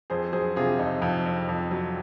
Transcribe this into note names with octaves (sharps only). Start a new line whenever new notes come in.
F2 G#4 C5
F#3 G#4 C5
C3 F4 G#4
F2 D#4
F2
F2
F2
F#3